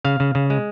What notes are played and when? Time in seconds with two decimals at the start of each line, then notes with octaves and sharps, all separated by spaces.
0.05 C#3 F5
0.20 C#3
0.35 C#3
0.50 G#3